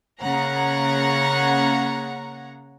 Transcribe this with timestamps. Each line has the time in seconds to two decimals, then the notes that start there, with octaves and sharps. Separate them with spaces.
0.21 C#3 A#3 C#5 F#5 A#5